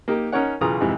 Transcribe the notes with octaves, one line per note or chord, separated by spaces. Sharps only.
A#3 D#4 G4
C#4 D#4 A#4 C#5 F#5
B1 C#3 E3 F4 A#5 D#6
F2 G#2 C3 E3